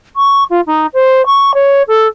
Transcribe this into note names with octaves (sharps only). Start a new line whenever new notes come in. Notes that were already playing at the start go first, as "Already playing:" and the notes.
C#6
F4
D#4
C5
C#6
C#5
A4